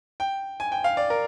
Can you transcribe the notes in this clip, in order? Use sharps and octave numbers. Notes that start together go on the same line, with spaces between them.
G5
G#5
G5
F5
D5
A#4